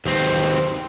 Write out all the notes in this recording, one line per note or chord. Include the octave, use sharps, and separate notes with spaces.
D#2 C4